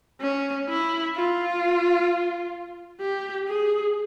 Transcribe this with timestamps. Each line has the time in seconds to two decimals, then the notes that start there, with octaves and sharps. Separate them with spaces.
0.21 C#4
0.69 E4
1.15 F4
3.00 G4
3.48 G#4